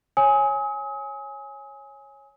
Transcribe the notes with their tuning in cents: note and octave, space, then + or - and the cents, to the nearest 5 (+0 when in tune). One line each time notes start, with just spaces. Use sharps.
C#5 -15 G#5 +0 D#6 +40